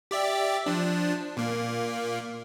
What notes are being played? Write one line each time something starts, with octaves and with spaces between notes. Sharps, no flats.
G4 D5 E5
F3 D4
A#2 A#3